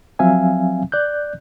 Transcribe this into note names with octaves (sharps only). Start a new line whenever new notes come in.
F3 F#3 C4 E5 F5 G#5
D5 F#6 G6